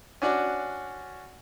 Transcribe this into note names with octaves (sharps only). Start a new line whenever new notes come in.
C#4 D4 F#4 D5